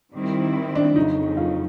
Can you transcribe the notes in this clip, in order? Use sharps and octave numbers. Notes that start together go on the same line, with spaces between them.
D#3 G3 C4 E4
D4
F2 C#3 F#3 D#4
F4